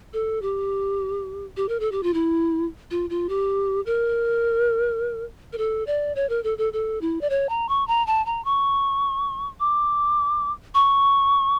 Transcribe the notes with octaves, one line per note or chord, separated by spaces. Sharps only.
A4
G4
G4
A#4
A4
G4
F4
E4
F4
F4
G4
A#4
A#4
A4
D5
C#5
A#4
A4
A4
A4
E4
D5
C#5
A#5
C#6
A#5
A5
A#5
C#6
D6
C#6